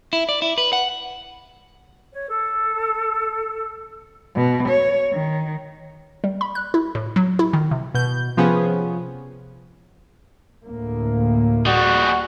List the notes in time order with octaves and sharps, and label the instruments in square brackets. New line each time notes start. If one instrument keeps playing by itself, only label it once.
[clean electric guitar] E4
D5
E4
B4
F#5
[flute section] C#5
A4
[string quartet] B2
C#5
D#3
[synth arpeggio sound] G3
B5
F#6
E4
A2
F#3
E4
D#3
C3
[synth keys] B2 G6
C3 F3 B3 C#4 G#4
[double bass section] D2 A2 A#3
[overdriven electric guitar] G3 G#4 [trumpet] F#4